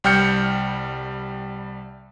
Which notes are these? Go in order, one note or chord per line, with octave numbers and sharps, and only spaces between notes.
C2 G3 G5 F6 G6 C#7